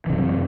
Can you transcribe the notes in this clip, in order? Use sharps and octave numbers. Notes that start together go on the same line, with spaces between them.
F#2 C3 E3